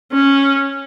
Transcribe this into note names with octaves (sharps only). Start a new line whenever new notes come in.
C#4